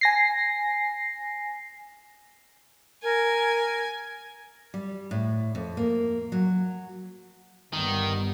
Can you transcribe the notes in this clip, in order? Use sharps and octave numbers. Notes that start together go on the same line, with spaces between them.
G#5 A#6 C7
A#4 G#5
G3
A2
F2
A#3
F#3
G1 D#3 G3 B3